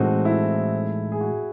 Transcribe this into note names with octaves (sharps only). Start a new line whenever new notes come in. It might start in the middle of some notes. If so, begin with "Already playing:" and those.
Already playing: A2 E3 G#3 C4 D#4 F#4 A4
E4
G#4
F#4